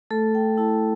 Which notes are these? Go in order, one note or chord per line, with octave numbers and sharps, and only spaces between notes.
A3 A4
G5
E4 A5